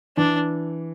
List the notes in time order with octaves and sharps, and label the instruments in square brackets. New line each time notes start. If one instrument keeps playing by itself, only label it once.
[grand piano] E3 [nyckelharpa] D4